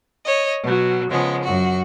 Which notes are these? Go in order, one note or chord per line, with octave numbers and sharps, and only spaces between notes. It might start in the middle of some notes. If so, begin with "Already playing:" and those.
C#5 D#5
B2 F#3
C#3 F3 G#3 B3
F#2 F#4